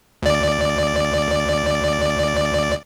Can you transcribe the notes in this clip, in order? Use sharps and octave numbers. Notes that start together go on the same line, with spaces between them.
D2 D5